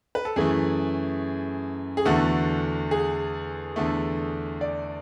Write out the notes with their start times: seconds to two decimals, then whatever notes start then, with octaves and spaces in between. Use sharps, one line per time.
0.15 B4
0.25 A4
0.36 F#2 E3 A3 G#4
1.97 G#4
2.05 E2 D3 A3 F#4
2.91 G#4
3.76 E2 D3 A3
4.61 D5